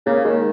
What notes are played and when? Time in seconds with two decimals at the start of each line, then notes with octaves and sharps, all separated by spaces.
0.06 C#3 A#3
0.24 D#3 G#3